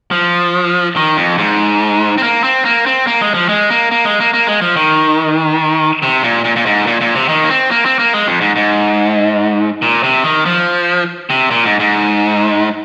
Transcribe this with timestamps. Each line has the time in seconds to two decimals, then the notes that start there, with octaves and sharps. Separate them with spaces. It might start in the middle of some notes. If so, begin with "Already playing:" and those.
0.11 F3
0.96 D#3
1.17 F2
1.38 G#2
2.18 C4
2.23 A#3
2.44 C4
2.65 A#3
2.86 C4
3.07 A#3
3.22 G#3
3.34 F3
3.49 G#3
3.70 A#3
3.91 A#3
4.05 G#3
4.20 A#3
4.34 A#3
4.47 G#3
4.61 F3
4.76 D#3
6.03 C3
6.23 A#2
6.44 A#2
6.56 A#2
6.66 G#2
6.87 A#2
7.01 A#2
7.15 C3
7.29 D#3
7.44 A#3
7.50 C4
7.71 A#3
7.85 C4
7.99 A#3
8.13 G#3
8.27 F2
8.41 G#2
8.56 G#2
9.82 A#2
10.03 C3
10.24 D#3
10.46 F3
11.30 C3
11.51 A#2
11.65 G#2
11.80 G#2